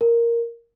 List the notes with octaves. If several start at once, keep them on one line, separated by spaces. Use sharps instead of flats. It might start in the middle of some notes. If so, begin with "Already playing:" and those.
A#4